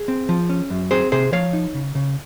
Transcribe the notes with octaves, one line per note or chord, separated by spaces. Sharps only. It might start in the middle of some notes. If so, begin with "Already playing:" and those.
Already playing: G#4
C4
F3
C#4
F#2
C4 G#4 C5
C3 G#4 C5
F3 C#5 F5
D#4
C#3
C#3